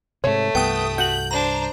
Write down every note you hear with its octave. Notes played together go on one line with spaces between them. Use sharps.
G#2 C3 A3 C#5
C2 G2 B3 G5 D#6
F#4 G6 F#7
D4 C5 A#5